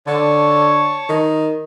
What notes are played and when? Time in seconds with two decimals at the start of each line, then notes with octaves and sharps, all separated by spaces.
0.07 D3 C#5 A5 C#6
1.09 D#3